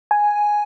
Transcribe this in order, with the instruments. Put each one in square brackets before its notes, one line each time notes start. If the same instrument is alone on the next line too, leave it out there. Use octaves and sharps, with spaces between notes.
[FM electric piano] G#5